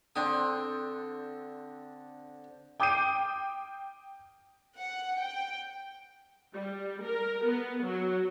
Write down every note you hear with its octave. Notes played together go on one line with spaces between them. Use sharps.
D3 C4 D4 G5 D#6
G5 D6 D#6 G6 C7 D#7
F#5
G5
G3
A#4
B3
F#3